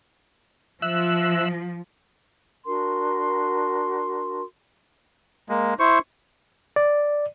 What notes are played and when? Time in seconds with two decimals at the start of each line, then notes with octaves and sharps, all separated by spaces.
0.82 F3 E5 E6 F#6
2.65 D4 F#4 A#4 C6
5.49 G#3 A#3
5.79 E4 C5 C#6
6.76 D5